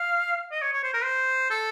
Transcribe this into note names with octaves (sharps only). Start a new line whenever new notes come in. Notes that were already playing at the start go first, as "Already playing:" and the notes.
Already playing: F5
D#5
C#5
C#5
C5
A#4
C5
A4